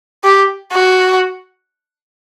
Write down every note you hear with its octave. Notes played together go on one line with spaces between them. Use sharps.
G4
F#4